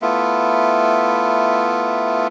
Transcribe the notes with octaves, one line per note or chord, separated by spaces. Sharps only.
A3 B3 E4 F4